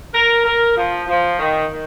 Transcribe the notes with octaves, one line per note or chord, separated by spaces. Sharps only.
A#4
A#4
F3
F3
D#3
D#3